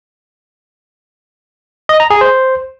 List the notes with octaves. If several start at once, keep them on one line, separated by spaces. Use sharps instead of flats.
D#5
A#5
G#4
C5